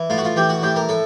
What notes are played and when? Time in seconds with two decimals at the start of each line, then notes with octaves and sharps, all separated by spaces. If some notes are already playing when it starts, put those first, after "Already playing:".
Already playing: E3
0.10 A2 F4
0.18 F#4
0.25 F4
0.36 E3 G4
0.49 F#4
0.62 A2 G4
0.76 A#4
0.89 A2 A4